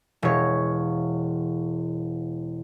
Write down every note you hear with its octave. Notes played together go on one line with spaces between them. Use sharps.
E1 C#5